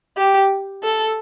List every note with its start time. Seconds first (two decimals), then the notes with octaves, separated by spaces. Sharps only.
0.17 G4
0.84 A4